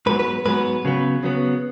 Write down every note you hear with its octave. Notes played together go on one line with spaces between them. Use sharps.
G#2 F#3 B3 B4
B4
G#2 F#3 B3 B4
C#3 F#3 B3
C#3 F#3 B3